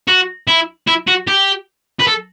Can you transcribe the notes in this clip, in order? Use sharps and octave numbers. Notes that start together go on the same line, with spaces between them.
F#4
E4
E4
F#4
G4
B4
A4